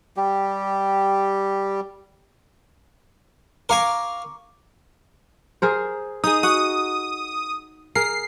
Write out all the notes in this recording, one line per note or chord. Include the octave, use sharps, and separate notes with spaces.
G3 G4
A#4 F5 G#5 A#5 C#6 D6
G#4 A#4 C5
D#4 G#4 D#6
F#4 F#5 D#6
G#4 A#4 C7